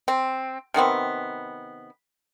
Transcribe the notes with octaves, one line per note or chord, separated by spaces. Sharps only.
C4
C3 D#3 B3 C4